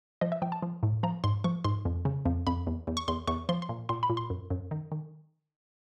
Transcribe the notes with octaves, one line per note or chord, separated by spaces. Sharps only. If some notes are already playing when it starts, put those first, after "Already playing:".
F3 D#5
E5
F3 G5
A5
F3
A2
F3 A#5
G#2 C6
F3 C#6
G#2 C6
F2
C#3
F2
F2 B5
E2
E2
C#6
E2 C6
E2 C#6
F3 C6
C6
A#2
A#2 C6
B5
A#2
C6
F#2
F#2
D#3
D#3